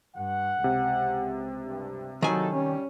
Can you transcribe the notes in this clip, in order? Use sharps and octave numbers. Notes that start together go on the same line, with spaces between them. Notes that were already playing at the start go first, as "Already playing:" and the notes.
G2 F#5
C#2 C3
G2
D#3 E3 F#3 D#4 A4 G#5
G3 C#4